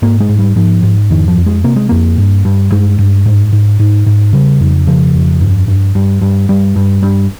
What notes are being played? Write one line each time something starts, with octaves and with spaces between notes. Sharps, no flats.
G#2 A#3
G#3
G#2
G3
G#2 F3
G#2
F2 D#3
F3
F2
G#3
C3 A#3
G#3
F2 A#3
G2
G2
G2 G#3
G2
G#2
G#2
G#2
G#2
C#3 G3
F2
C#3 F3
F2
G2
G2
G2
G2
G2 G3
G2
G2